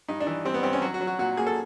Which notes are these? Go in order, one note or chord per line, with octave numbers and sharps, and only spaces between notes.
G2 D#4
D4
E3
G3 C4
B3
G2 C4
C#4
F#3 F#4
F#4
F#3
F#4
A#2 F#4
A#3 G#4
A4